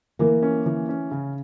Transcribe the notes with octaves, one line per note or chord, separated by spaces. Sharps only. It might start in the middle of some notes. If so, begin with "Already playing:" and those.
E3 A#3
C#4
E3
C#4
C#3